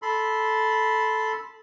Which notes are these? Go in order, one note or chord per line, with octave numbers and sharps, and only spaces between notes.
A4 B5 C6